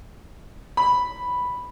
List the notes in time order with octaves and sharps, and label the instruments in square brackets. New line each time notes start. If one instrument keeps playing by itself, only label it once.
[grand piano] B5